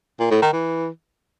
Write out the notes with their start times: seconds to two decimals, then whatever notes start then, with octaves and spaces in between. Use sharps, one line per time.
0.20 A#2
0.31 A2
0.42 D#3
0.53 E3